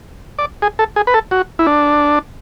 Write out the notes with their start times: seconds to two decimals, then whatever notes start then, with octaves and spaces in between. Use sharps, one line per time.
0.39 D5
0.62 G#4
0.79 A4
0.96 G#4
1.07 B4
1.14 A4
1.31 F#4
1.59 E4
1.67 D4